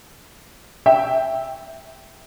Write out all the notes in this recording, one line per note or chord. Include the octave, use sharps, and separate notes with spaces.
E5 G5